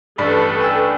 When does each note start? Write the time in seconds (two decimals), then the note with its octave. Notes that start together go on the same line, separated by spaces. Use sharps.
0.18 A1 G2 A4 B4 D5 B5
0.61 G5 G#5 E6